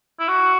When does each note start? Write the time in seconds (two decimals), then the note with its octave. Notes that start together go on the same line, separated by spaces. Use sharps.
0.19 E4
0.28 F#4